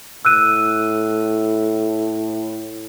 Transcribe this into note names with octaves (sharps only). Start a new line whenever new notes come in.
A2 E6 F#6 D#7